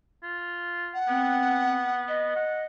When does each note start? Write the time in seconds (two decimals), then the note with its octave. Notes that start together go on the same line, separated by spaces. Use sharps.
0.23 F4
0.94 F#5
1.08 B3 C4
2.08 D#5
2.36 F#5